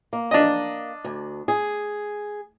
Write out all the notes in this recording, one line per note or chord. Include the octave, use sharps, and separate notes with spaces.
A#3
D4 D#5
D2
G#4